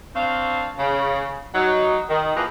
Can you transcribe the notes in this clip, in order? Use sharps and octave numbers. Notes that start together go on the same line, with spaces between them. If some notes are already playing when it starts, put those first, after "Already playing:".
C4 D4 C#5 F5
C#3
F#3 D#4
D#3
E3 F3 A#3 G#4 A#4 B4